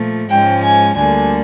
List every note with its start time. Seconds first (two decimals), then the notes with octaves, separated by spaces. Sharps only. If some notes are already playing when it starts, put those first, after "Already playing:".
Already playing: A#2 F3 A3
0.30 G#2 F3 G#3 C#4 G5
0.64 G#5
0.98 D2 D3 G3 A#3 D4 G#5